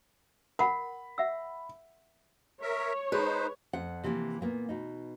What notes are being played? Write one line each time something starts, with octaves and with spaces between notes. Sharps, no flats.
A#4 F#5 B5
E5 F#5 E6
A#4 C#5 E5
G#3 D#4 B4 C5
F2 C5 F#5
C3 E3 F3 G3 A#3
A#2 A#3 B3
B2 D#4